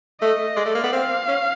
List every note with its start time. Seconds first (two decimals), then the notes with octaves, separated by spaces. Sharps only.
0.21 A3 D#5
0.57 G#3 D5
0.66 A3
0.75 A#3
0.84 B3
0.93 C4 F5
1.28 C#4